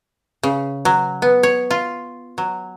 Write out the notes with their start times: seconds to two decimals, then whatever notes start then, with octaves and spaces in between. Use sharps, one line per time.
0.43 C#3
0.85 F#3
1.22 B3
1.43 C#5
1.71 F4
2.38 F#3